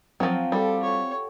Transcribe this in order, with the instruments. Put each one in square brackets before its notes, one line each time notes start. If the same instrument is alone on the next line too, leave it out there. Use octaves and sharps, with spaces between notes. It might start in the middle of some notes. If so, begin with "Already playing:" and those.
[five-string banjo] F3 F#3 [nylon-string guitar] C4 [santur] F4
[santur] F3 F#4 [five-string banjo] G3 [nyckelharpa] A4
[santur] G4 A4 G5 [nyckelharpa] C#5